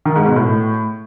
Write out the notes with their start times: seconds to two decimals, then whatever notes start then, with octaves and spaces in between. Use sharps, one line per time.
0.05 D#3
0.16 G#2
0.26 B2
0.36 A2